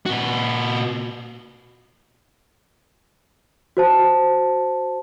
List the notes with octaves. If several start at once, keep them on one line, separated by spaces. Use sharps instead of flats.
A#2 F#4
F#4 C5 A5